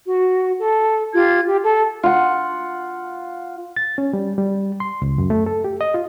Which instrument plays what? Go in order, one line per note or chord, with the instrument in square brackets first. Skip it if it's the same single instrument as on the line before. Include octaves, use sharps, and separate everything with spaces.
[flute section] F#4
A4
F4 G4 G#6
G4
A4
[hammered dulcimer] F4 F#5
[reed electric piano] A6
C#4
G3
G3
C6
C#2
F#2
A3
A4
G4
D#5
F4